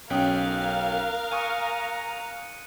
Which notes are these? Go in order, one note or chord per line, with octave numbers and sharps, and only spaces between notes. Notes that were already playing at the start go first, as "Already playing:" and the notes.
B1 C#4 A#4 F5 G5 D#6 F#6
G#5 A#5 C#6 D#6 C#7 D#7